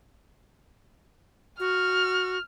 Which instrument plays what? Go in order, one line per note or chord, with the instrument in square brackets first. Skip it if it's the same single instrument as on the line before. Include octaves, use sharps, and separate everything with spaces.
[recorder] F#4 [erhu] F6